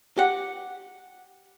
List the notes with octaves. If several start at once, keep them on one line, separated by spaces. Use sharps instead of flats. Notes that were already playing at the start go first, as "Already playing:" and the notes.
G4 F#5